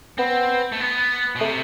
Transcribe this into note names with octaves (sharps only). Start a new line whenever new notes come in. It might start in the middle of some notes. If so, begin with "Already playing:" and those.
B3 C4
A3
B3
B2
C3 A3